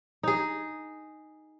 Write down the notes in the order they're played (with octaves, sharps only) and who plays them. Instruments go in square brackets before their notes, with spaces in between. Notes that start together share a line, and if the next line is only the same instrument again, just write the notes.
[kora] D#4 G#4